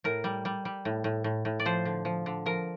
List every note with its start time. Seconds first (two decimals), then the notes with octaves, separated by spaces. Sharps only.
0.04 A2 A#4
0.24 G3
0.45 G3
0.65 G3
0.85 A2
1.04 A2
1.24 A2
1.45 A2
1.60 D5
1.65 F3 C5
1.85 D3
2.05 F3
2.26 D3
2.46 F3 A#4